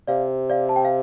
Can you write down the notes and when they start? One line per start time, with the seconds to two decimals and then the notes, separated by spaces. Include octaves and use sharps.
0.07 C3 D5 F5
0.50 D5 F5
0.69 A5
0.76 G5
0.85 F5